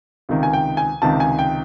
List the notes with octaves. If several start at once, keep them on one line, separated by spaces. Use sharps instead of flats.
C#2 C3 D#3
G#5
G5
G#5
C#2 C3 D#3 A5
G#5
G5